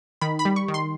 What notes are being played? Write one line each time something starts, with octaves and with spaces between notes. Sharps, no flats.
D#3 B5
B5
G3
C#6
D#3
C6